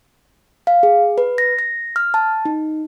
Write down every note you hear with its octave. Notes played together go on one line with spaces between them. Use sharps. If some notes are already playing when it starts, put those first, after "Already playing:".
F5
G#4
B4
A#6
A#6
F6
A5
D#4